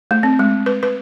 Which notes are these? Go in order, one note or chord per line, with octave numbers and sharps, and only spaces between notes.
A3
C4
G#3
B4
B4